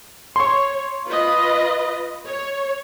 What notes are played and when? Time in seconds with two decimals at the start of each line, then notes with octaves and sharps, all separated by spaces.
0.36 C#5 C6 C#6
1.07 F4 B4 D#5
2.27 C#5